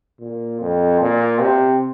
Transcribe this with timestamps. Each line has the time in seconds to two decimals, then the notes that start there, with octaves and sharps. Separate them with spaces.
0.20 A#2
0.61 F2
1.01 A#2
1.40 C3